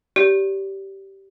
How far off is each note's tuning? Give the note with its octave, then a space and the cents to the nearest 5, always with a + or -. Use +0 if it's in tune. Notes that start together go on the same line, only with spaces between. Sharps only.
G4 -10 D5 -35